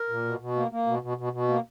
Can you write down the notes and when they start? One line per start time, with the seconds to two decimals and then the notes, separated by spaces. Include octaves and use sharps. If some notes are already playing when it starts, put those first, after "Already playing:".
Already playing: A#4
0.09 A#2
0.25 B2
0.40 B2
0.56 A#3
0.71 A#3
0.87 B2
1.02 B2
1.17 B2
1.33 B2
1.48 A#3